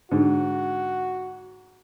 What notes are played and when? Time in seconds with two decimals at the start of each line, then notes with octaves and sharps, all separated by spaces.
0.11 G#2 D3 F#4